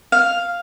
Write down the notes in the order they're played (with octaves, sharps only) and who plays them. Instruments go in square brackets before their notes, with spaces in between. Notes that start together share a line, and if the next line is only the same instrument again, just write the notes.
[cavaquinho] F5